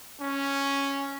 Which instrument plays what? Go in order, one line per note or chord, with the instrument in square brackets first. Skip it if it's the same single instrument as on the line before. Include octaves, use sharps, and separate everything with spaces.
[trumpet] C#4